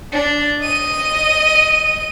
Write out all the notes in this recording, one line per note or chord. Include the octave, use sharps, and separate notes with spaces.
D4
D#5 D#7